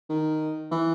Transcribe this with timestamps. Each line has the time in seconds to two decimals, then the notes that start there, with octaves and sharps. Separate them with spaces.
0.09 D#3
0.71 E3